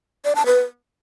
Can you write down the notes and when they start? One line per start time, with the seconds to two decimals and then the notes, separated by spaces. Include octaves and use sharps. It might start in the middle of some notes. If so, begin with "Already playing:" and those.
0.25 D5
0.35 A5
0.46 B4